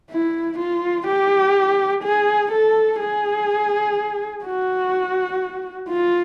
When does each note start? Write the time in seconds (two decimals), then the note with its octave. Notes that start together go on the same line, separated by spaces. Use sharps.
0.11 E4
0.59 F4
1.07 G4
2.03 G#4
2.52 A4
3.00 G#4
4.44 F#4
5.89 F4